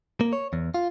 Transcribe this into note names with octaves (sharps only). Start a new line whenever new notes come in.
A#3
C#5
E2
F4